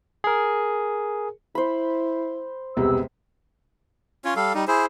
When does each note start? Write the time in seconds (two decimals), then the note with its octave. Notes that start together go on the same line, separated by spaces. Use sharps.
0.24 G#4 A#4
1.55 E4 C5 B5
2.77 E1 C2 B3 G4 E6
4.25 C#4 F4 C#5
4.36 G3 A4 F5
4.54 G3 D#4
4.68 E4 G#4 C5